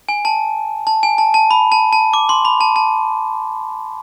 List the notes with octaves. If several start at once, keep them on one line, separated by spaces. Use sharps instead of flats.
G#5
A5
A5
G#5
A5
A5
B5
A5
A5
D6
C6
B5
A5
A5